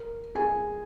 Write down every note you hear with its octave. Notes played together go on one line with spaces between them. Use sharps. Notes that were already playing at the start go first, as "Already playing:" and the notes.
Already playing: A#4
G#4 G#5